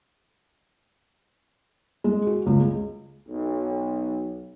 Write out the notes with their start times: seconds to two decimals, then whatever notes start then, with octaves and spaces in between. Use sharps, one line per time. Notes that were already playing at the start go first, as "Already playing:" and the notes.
2.04 G#3
2.27 F#4
2.46 C#2
2.60 G#3
3.28 B1